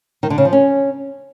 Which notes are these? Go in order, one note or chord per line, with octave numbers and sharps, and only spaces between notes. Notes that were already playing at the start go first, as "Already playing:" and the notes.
D#3
D3
C#3
F3
C#4